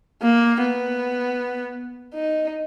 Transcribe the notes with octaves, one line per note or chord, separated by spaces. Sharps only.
A#3
B3
D#4